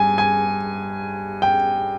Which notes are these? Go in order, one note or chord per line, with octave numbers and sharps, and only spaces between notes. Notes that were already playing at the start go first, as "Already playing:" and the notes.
Already playing: G2 G#5
G#5
G5